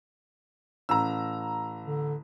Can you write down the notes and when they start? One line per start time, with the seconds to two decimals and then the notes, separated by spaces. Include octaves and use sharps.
0.89 A1 A#5 E6
1.85 D3